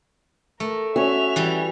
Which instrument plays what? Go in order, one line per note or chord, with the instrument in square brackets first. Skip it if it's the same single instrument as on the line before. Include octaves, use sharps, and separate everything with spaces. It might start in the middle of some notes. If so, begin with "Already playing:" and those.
[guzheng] A3 [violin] A#4
[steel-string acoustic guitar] C#4 F#4 [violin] E5 F7
[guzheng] E3 G3